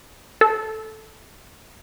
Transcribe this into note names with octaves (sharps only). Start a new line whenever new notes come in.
A4